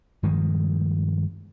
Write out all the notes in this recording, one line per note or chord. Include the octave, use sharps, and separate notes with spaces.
G2 D#3 F3 G#3